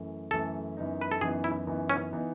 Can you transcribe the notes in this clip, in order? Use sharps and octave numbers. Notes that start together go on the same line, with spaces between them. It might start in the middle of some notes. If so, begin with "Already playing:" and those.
Already playing: F#2 E3 A3
F#2 E3 A3 A4
F#2 E3 B3 D#4
B4
A4
F#2 E3 B3 D#4 G#4
E4
F#2 E3 B3 D#4
C#4
E3 B3 D#4